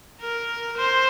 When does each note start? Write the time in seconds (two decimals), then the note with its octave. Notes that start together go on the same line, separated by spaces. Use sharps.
0.21 A#4
0.77 C5